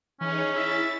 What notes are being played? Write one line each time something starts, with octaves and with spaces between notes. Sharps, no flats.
E3 C#4 D#4 G#4 C#5
E4 E5 A6